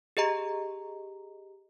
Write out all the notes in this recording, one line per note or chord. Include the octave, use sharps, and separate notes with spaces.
G4 G#4 D#5 A#5